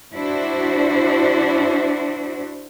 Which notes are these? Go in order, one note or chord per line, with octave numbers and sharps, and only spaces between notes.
D4 E4 F#4 C5